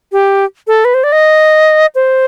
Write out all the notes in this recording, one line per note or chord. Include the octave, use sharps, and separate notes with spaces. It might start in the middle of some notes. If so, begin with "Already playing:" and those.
G4
A4
B4
C5
D5
D#5
C5